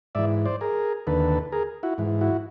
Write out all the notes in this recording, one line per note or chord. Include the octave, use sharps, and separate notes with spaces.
G#2 E3 D5 E5
C5 D5
G#4 A#4
D#2 D3 A4 B4
G#4 A#4
E4 F#4
G#2 E3
E4 F#4